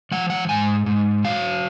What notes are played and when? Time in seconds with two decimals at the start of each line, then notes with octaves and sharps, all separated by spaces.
0.11 F3 F#5
0.30 F#5
0.49 G#2 G#5
0.86 G#2
1.25 F#3 F5